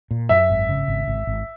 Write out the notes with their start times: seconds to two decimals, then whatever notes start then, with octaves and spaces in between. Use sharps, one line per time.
0.11 A#2
0.29 F#2 E5
0.50 G#1
0.69 C#3
0.88 G#1
1.07 G#1
1.27 G#1